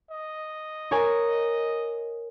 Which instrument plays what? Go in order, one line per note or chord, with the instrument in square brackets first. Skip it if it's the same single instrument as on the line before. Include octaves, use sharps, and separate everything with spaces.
[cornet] D#5
[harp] A#4 C#5 G#5